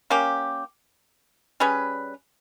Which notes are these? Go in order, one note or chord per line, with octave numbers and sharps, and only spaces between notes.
A#3 C#4 G4
G3 C#4 G#4 B4